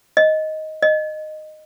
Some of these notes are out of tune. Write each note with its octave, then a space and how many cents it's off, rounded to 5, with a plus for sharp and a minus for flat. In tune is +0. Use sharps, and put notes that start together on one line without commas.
D#5 +10
D#5 -10